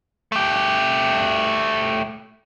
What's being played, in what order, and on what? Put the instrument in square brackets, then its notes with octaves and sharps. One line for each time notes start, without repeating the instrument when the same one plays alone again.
[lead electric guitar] A3 G4